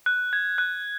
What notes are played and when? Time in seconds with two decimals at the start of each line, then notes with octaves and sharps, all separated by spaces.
0.06 F#6
0.33 G#6
0.58 F#6